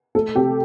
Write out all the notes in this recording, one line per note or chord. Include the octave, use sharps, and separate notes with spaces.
A3 A4
C3 G4